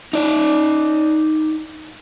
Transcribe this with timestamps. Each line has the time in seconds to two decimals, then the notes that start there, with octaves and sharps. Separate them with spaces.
0.13 D#4 D5